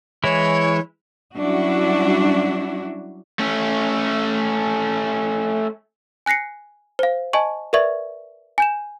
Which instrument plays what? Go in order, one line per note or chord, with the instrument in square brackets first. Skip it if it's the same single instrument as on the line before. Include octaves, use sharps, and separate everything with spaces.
[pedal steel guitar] E3 G#3 E4 [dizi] C#5
[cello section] F#3 G3 C#4 D4 E4 F#4
[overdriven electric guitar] A3 C#4
[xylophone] G#5 F#6 A#6 C7 C#7
C5 F5
D#5 G#5 A5 C#6
A#4 B4 D5 E5 C#6 G#6
G#5 G6 E7